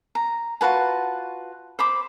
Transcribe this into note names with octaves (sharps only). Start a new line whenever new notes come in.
A#5
F4 F#4 B4 A5
C5 B5 D6